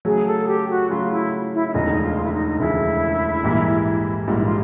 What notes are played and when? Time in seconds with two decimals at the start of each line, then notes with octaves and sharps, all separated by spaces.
0.05 C#3 F#3 A3 G#4
0.26 A4
0.47 G4
0.69 F#4
0.89 C#3 F#3 A3 F4
1.11 E4
1.53 E4
1.67 E4
1.73 E1 D2 C#3 F3 G#3 D#4
2.02 F4
2.23 E4
2.31 D#4
2.47 D#4
2.59 E1 D2 C#3 F3 G#3 E4
3.43 A#1 G#2 E3 G3 A#3
4.27 A#1 G#2 E3 G3 A#3 F4
4.37 E4
4.45 F4